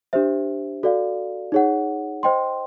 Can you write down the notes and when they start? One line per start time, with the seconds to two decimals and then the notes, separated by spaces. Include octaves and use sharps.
0.13 D4 G4 C5 E5
0.83 F#4 A4 D5 F5
1.52 D#4 G#4 C#5 F#5
2.23 C5 D#5 G5 C6